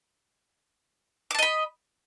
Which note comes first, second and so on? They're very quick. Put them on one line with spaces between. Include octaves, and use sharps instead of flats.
D6 A5 D#5 B5